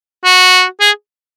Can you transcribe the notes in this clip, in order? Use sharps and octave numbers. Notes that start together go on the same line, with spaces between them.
F#4
G#4